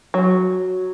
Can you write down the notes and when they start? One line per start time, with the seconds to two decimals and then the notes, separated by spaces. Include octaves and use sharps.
0.14 F#3